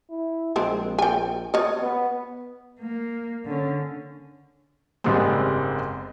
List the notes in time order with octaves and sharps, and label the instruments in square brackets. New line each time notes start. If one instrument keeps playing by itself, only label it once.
[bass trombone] E4
[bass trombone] A#1 [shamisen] F3 G#3 C4
[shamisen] G5 G#5
C#5 D#5
[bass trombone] B3
[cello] A#3
D3 C#4
[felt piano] F#1 G#2 G3 G#3 B3 C4